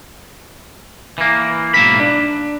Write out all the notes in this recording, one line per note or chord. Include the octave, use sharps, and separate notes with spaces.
E3 A#3
B1 G#2 A#3 E5 B5
D4